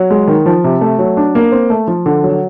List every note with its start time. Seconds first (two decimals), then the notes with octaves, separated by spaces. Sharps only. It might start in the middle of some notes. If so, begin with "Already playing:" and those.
Already playing: F#3
0.10 G#3
0.28 D#3
0.46 F3
0.64 C3
0.81 A3
0.99 F#3
1.17 D4
1.35 A#3
1.52 C4
1.70 A3
1.88 F3
2.06 D3
2.24 F#3